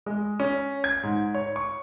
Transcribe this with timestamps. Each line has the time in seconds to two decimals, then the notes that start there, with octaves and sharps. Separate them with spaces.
0.06 G#3
0.40 C#4
0.84 G#6
1.03 G#2
1.35 C#5
1.56 C#6